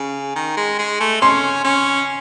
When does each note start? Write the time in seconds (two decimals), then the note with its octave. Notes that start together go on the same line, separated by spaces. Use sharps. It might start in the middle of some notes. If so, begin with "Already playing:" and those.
Already playing: C#3
0.35 D#3
0.57 G#3
0.79 G#3
1.00 A3
1.21 C#4 C6
1.64 C#4